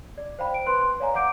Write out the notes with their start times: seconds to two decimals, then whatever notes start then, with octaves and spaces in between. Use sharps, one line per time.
0.18 D5
0.39 C5 F5 G5 B5
0.54 D7
0.67 B4 C6 F#6
1.00 C#5 D5 F5 G#5 A#5
1.14 D5 F5 F#5 D6 G6 D7